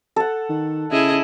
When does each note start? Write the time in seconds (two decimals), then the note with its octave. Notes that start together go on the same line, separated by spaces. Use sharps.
0.16 A4 F#5
0.50 D#3
0.92 C#3 E4 G#4 D#5